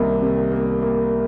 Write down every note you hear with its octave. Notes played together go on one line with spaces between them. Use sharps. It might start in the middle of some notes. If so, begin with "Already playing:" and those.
Already playing: C2 D#3 A#3
C3
A#3
A#3